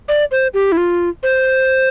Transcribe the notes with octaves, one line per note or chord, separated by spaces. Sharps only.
D5
C5
G4
E4
F4
C5